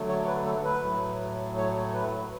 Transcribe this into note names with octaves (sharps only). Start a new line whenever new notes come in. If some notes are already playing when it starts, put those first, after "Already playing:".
Already playing: D3 F#3 A3
C#5
B4
A4
B4
A2 F#3 A3
C#5
B4